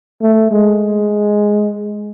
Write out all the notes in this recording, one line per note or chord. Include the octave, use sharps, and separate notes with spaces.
A3
G#3